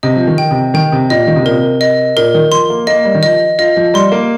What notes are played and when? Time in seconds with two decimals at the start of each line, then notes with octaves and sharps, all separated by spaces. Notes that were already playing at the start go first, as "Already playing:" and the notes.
0.03 C3 D#5
0.16 F3
0.27 D#3
0.38 G5
0.51 C3
0.74 D#3 G5
0.92 C3
1.10 A#2 D#5
1.27 D#3
1.36 C3
1.43 A#2
1.46 A#4
1.51 C3
1.81 D#5
2.17 A#2 A#4
2.34 D#3
2.52 F3 C6
2.70 A#3
2.87 A#3 D#5
3.05 G3
3.15 D#3
3.23 F3 D#5
3.59 F4 D#5
3.76 F3
3.94 G3 C6
4.12 A#3